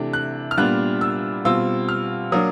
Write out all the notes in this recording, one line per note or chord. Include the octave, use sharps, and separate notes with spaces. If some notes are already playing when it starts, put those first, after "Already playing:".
Already playing: C3 E3 A3 D4
F#6
F6
A#2 G3 B3 D4 F4 F#6
E6
B2 G3 C4 F4 E6
F6
F#3 A#3 D4 D#6